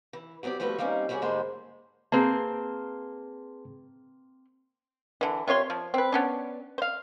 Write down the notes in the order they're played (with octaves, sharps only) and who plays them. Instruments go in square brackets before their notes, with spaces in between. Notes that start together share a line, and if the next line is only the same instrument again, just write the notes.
[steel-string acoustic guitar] E3
F#3 B3 C4 G4 D5
F3 G3 A3 F#4 A4 B4
G3 A#3 C4 C#4 D#4
G3 B3 C#4 F#4 G#4 D5
G#2 D3 G3 G#3 A#3 C5
[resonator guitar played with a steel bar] A#3 C4 [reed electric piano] G#4 B4 A5
[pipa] D3 E3
C3 F4 C#5 C6
F3
C4 B4
B3 C#4 D4
C5 F5